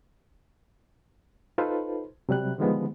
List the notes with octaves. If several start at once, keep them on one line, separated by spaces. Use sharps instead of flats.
D#4 F4 A4 B4 C5
C3 F#3 G3 F#6
D3 D#3 F3 G3 G#3 B3